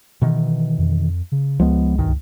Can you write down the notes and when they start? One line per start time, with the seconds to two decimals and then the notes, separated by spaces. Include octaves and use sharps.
0.22 B2 D#3 E3
0.78 F2
1.32 C#3
1.60 C#2 F3 G#3 B3
1.98 B1 G2 D#3